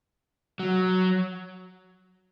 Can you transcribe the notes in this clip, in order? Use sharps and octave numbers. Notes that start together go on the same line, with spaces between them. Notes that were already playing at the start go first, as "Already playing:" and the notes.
F#3